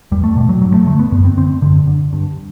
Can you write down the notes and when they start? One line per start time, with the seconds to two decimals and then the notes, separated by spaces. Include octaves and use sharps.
0.11 E2 G3
0.24 A3
0.36 B2 G3
0.49 F#3
0.62 G2 F#3
0.74 A3
0.87 D3 A3
0.99 B3
1.12 F#2 B3
1.25 C4
1.37 D3 C4
1.62 F#2 D3
1.87 D3
2.13 G2